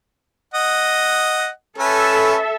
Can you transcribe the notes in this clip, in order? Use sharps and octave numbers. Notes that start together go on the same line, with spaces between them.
D#5 F#5
C#4 A4 B4 E5